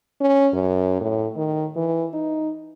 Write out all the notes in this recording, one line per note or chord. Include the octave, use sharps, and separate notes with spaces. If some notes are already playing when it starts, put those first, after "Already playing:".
C#4
F#2
A2
D#3
E3
D#4